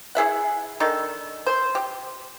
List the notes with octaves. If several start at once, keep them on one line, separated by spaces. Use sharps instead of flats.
E4 G#4 E5 F#5
D#3 D4 D#4 A4
C5
G4